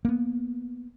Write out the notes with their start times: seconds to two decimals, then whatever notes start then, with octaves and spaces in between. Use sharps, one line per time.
0.05 A#3 B3